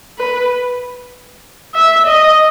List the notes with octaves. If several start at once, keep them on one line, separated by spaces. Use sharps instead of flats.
B4
E5
D#5